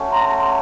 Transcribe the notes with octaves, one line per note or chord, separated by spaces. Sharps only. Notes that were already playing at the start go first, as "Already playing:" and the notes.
Already playing: A3 C#4 F#4
A#5 C6